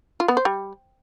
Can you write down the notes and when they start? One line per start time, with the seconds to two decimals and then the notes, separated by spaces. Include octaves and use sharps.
0.20 F4
0.28 B3
0.37 C5
0.45 G3